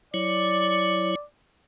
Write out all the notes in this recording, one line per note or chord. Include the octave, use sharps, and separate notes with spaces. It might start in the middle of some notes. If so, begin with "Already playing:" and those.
F#3 E4 C#5 D5